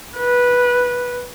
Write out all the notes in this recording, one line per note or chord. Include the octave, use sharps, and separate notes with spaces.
B4